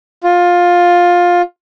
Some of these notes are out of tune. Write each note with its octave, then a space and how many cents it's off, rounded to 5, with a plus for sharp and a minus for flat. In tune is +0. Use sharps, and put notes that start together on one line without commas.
F4 +15